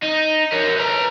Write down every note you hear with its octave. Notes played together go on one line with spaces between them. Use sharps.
D#4
A#4 C#5
B4 A#5